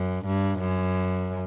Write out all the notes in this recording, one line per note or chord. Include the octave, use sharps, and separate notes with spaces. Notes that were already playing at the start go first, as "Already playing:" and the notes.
Already playing: F#2
G2
F#2